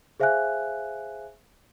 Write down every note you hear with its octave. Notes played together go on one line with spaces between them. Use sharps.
G#4 C5 E5 F5 G#5 F#6